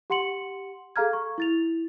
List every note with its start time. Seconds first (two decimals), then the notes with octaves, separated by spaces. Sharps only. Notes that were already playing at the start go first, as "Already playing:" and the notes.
0.10 G4 F#5 C6 C#7 F#7
0.96 G#4 A4 F5 A#5 F6 G#6
1.13 C#6
1.38 E4 A6 F7